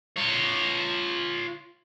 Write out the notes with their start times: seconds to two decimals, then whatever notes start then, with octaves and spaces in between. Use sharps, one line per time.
0.16 F4 C#5